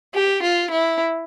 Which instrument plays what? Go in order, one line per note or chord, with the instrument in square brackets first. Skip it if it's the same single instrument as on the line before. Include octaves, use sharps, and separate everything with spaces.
[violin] G4
F4
E4